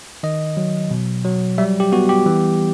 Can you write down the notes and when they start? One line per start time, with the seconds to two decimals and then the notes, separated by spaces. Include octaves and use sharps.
0.23 D#3 D#5
0.57 F#3
0.91 B2
1.25 F#3
1.58 G3 E5
1.80 G4
1.92 B3 F#4
2.09 G4
2.26 E3